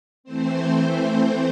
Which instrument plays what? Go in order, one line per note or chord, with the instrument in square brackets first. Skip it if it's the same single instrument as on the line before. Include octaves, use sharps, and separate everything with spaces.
[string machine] E3 A3 C4 C5